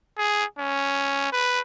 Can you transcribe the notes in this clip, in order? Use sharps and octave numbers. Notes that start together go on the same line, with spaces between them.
G#4
C#4
B4